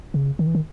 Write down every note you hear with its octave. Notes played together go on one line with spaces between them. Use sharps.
C#3
D#3
E3
D#3